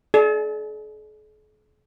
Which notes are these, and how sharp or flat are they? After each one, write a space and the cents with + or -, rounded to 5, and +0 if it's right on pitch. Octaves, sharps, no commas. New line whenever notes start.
G#4 +45 D5 +0